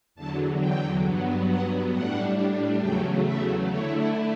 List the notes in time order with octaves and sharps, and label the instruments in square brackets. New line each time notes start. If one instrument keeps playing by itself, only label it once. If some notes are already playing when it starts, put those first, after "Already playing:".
[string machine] E2 D3 F#3 A5
G5
G2 F#3 B3
F#5
A2 G3 D4 F#5
E2 C#3 F#3 A3 G5
E5
D3 A3 E4 C#5